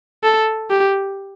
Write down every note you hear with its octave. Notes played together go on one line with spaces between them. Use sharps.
A4
G4